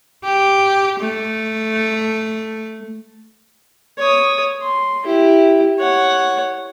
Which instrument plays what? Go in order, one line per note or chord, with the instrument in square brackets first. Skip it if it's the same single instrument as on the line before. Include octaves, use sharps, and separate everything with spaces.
[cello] G4
A3
[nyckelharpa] C#5 D#6
C6
E4 G4
C#5 F#5